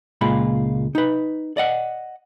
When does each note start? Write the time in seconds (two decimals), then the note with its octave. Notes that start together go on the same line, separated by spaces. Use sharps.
0.21 C#2 A#2 G#3 F4 B5
0.95 D#4 B4
1.57 D5 D#5 F#5